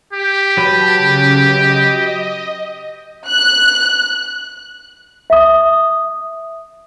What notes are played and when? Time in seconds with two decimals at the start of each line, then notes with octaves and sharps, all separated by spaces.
0.13 G4 B6
0.57 F#3 B4 A5 A6
0.97 C#3
1.49 D#5
3.28 F#6
5.30 E5 D#6